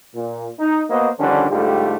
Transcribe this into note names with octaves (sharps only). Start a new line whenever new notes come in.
A#2
D#4
A#3 B3 F#4 C5 D#5
D3 D#3 F3 G3 C#4 D4
G#2 D3 G3 A3 F4 G4